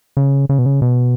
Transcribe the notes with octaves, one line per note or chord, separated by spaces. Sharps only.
C#3
C#3
B2
C#3
B2